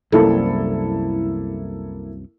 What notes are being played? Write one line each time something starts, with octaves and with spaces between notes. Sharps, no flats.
C2 F#2 A#3 E4 A4